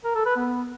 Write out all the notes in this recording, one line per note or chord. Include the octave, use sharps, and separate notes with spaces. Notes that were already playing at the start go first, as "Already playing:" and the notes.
A#4
A4
B4
B3